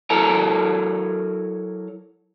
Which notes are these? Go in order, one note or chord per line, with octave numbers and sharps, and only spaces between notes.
F#3 E4 A4 A#4 A5 A#5